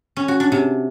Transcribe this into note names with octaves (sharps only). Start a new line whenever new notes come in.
C#4
F#4
D4
C3